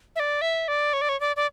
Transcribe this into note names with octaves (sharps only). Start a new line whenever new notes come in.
E5
D5
E5
D5
C#5
D5
C#5
D5
D5